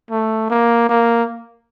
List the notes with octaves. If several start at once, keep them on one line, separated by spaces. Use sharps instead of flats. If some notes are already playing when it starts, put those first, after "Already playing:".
A3
A#3
A#3